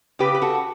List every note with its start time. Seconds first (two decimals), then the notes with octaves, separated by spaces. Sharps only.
0.19 C#3 G4 B4
0.35 B4
0.42 F#4 A4